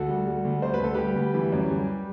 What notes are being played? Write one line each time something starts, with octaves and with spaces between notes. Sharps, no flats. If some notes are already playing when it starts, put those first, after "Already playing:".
Already playing: D2 F#4 A4
G3
G3
D2
D2 C5
B4
D2 A4
G3 G4 B4
D2
E3
F#2
G3